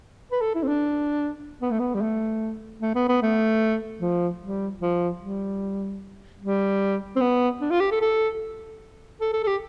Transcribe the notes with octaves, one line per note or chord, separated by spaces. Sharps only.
B4
A4
E4
C4
D4
B3
A3
B3
G3
A3
A3
B3
B3
A3
F3
G3
F3
G3
G3
C4
B3
D4
F4
G4
A4
A4
A4
A4
A4
G4